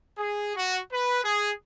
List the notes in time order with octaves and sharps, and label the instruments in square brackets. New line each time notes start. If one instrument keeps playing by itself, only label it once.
[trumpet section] G#4
F#4
B4
G#4